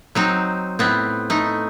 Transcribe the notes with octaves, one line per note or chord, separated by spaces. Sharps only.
F#3 C4 D#4
A2 B3 C4
A3 D#4